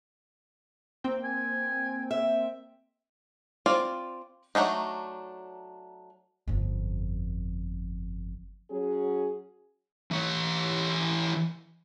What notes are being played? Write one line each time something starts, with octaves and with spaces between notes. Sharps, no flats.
A#3 C4 G5
G#5
E5
C4 F4 D5
F#3 A3 D4 D#4
G1 F2
F#3 C#4 F#4 G#4
E3 C#5